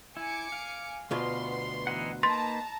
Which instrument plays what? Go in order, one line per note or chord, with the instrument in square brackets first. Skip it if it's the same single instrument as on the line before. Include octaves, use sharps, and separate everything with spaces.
[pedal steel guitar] E4 [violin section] G#5 D6 C#7
[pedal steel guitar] F5
[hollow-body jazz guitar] D2 B2 F4 [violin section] B3 C6
[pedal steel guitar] E3 D#4 F#5
[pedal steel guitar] A#3 D#4 B4 [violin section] A5 A#5 [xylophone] C6 A6